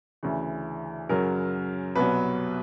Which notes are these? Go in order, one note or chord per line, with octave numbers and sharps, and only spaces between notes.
D2 C#3 E3
F#2 C#3 F#3 A#4
C2 B2 F#3 B4